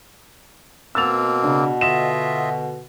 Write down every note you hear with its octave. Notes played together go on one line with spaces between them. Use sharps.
B2 A#3 C4 E6 A6 F7
C#3 D4
D3 F4 D#5 E5 E7